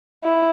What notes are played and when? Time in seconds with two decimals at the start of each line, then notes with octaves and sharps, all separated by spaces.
0.24 E4